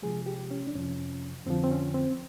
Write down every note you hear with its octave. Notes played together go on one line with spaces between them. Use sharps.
C3 F3 G#3 G#4
G4
C#4
D4
F2 C3 F3 C#4
F2 D3 F3 C4
C4
C#4
C4